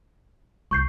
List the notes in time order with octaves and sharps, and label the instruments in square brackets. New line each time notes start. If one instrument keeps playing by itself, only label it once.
[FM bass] C2 [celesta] C#6 G6 C7